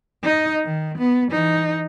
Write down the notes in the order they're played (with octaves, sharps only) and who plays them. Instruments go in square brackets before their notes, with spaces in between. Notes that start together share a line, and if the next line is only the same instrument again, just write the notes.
[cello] D#4 D#5
D#3
B3
E3 D#4